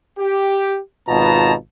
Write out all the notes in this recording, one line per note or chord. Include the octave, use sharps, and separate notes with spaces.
G4
G#1 B2 B3 F4 A5 A#5